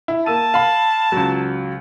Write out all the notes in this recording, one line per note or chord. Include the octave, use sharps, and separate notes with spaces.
E4
A#3 A5 E6 D#7
F5 B5
C#2 F#3